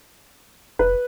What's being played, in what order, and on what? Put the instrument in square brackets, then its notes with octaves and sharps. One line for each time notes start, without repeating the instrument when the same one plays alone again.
[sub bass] F1 [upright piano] B4